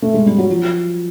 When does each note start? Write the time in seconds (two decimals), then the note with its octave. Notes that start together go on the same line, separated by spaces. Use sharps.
0.02 A3
0.14 G#3
0.26 G3
0.38 F#3
0.50 F3